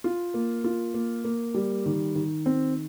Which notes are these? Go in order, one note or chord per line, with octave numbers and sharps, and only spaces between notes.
F4
A#3
F4
A#3
A#3
G3
D#3
D#3
C4